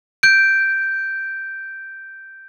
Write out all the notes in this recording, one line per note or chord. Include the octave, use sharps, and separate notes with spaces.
G6 D7